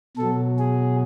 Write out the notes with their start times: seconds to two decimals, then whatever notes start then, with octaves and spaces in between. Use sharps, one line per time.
0.17 B2 F#3 A4
0.59 G#4